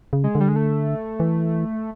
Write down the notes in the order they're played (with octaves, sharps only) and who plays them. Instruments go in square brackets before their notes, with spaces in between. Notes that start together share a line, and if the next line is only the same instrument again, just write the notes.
[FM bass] C#3
[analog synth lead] G#3
[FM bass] D3
[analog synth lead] G3
G#3
A3
[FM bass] E3